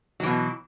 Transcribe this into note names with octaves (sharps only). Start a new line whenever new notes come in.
B2 E3 F#3